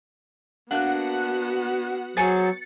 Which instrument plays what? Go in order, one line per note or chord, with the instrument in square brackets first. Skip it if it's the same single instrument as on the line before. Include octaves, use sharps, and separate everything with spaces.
[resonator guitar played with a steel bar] A#3 D4 [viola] B3 F#4 [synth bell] F#5 F#6
[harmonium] F#3 [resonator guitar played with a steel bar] G#4 C5 G#5 [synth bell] A6 C#7